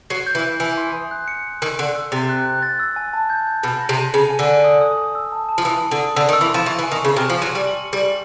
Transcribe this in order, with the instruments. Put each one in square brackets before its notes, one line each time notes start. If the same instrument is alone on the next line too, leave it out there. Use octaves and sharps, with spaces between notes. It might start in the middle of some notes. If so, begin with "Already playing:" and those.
[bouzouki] F#3 [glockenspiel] C7
[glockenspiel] G6
[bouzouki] E3
[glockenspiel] G6
[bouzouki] E3 [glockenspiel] G#5
[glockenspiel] C6
D#6
F#6
C#7
F#6
[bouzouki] D#3 [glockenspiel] E6
[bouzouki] D3 [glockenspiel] C6
[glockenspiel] E6
[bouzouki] C3 [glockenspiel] A6
[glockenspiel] F#6
F#6
A6
E6
G#5
A5
G6
G6
[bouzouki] B2 [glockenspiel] G6
[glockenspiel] A#6
[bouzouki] C3
[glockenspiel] D#7
[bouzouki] C#3 [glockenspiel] G#5
[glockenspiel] G#5
[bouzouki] D3
[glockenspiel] G#5
D#6
D#6
D#6
E6
A5
A5
[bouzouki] F3
[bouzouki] E3 [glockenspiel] D#6
[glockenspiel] D#6
[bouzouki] D3
[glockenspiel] D#6
[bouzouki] D3 [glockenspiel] E6
[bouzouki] D#3
[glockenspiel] E6
[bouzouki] E3
[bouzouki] F3 [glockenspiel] C6
[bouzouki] E3 [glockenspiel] C#6
[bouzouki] E3
[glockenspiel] G#5
[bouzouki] D#3
[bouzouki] C#3 [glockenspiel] C#6
[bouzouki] C3 [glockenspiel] F6
[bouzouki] F3
[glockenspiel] C6
[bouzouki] F#3
[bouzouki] G3 [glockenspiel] D#7
[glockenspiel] F#7
C#7
[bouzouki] G3
[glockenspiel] F#7